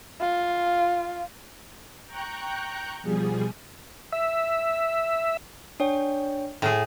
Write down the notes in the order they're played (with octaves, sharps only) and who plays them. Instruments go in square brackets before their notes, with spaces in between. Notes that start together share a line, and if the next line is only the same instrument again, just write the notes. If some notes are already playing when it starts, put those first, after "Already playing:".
[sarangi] F4
[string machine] G5 A#5 C#6 F#6 G6
B2 F3 G3 G#4
[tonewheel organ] E5
[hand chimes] D4 C#5 G5
[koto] A2 G#4